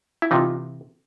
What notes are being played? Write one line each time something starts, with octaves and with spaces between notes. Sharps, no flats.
E4
C3 E3 D#4 F4